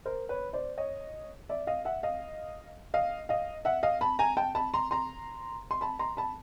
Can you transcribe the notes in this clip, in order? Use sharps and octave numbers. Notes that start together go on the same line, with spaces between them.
A#4 C5
B4 C#5
C5 D5
C#5 D#5
D5 E5
D#5 F5
E5 F#5
D#5 F5
D#5 F5
D#5 F5
E5 F#5
D#5 F5
A5 B5
G#5 A#5
G5 A5
A5 B5
A#5 C6
A#5 C6
C6
A5 B5
A#5 C6
A5 B5